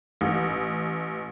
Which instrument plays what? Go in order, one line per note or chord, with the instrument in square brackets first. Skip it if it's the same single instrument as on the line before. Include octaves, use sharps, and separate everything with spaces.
[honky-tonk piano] A1